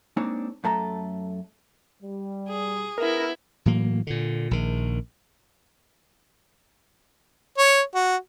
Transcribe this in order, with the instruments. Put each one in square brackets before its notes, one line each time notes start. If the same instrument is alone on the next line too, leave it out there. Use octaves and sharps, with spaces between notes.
[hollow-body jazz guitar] G#3 A#3 C4 D4 D#4 C#5
F#2 A3 A4 A#5
[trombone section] G3
[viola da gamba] G#4
[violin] B3 E4 [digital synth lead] A#4
[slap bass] A2 E3 F#3 A#3
A#2 D3
A#1 D#3
[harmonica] C#5
F#4